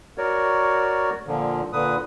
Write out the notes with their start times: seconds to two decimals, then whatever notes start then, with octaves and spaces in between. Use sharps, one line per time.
0.18 F#4 A#4 C#5 D5
1.27 A#2 D3 F3
1.73 A#2 D3 B4 D#6